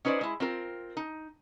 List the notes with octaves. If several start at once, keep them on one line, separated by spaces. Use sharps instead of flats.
C#4 D#4 B4 C5 D5
G#3 E4
C4 F4 A#4
D#4